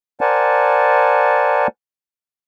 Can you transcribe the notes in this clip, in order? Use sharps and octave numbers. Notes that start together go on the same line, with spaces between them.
A#4 C5 D5 F#5 G#5 A5